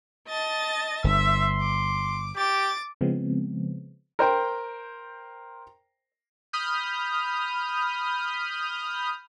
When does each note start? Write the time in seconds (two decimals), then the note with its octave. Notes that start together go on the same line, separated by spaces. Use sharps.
0.28 D#5 A5 A6
1.04 G1 E5 C6
1.60 D6
2.36 G4 D6 A6
3.01 C#3 F3 G#3 B3 C4
4.19 A#4 C5 G5
6.53 B5 D#6 F6 G6